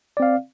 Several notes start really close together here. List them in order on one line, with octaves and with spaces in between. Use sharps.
D5 C4 F5